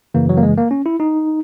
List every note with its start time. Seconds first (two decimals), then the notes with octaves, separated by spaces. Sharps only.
0.14 F#2 C#3 E3 A#3
0.29 F#3
0.37 A#3
0.43 G#3
0.57 A#3
0.71 C#4
0.86 E4
1.00 D#4